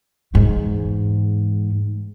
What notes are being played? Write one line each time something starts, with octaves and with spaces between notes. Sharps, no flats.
E2 G#2